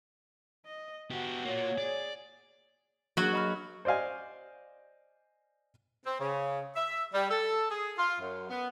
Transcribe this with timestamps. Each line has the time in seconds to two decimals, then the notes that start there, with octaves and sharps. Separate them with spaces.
0.66 D#5
1.10 B3 F#4 G4
1.45 A#3 F4 C#5
1.78 G#4 D5
3.17 F#3 A#3 D4 F#4 G#4
3.33 D#5 B5 F6
3.85 C5 D5 D#5 F5 G#5
6.05 C4
6.20 C#3
6.76 E5
7.13 G3
7.30 A4
7.70 G#4
7.98 F4
8.19 F#2
8.49 B3